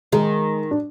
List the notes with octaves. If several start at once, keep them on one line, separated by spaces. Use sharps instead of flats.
D#3 G#3
D4